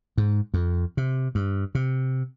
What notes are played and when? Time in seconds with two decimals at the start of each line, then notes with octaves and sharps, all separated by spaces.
0.18 G#2
0.54 F2
0.97 C3
1.35 G2
1.75 C3